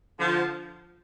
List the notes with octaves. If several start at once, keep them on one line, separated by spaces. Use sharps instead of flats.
D3 F3